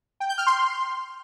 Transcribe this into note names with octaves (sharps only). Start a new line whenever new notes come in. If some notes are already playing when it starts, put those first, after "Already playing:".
G5
G6
F6
C6